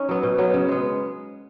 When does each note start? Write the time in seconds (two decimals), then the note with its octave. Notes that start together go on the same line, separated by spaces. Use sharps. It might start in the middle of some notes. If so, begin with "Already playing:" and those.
Already playing: C#4 D#4
0.09 F#3 B3
0.23 B2
0.38 F#3 B3
0.53 C#3
0.68 G#3 B3